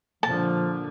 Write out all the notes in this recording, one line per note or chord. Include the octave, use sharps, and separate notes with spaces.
A#2 D3 F3 A5